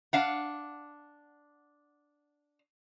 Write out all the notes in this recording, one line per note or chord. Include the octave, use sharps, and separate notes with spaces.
D4 F5 F#5